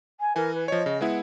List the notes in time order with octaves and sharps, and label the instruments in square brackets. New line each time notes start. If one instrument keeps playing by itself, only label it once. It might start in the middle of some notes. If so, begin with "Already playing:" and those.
[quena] G#5
[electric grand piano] E3 G#5 [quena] A#4
[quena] B4
[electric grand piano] F3 C#5 [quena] D#5
[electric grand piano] C#3
[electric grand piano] G#3 B3 E4 [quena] F#5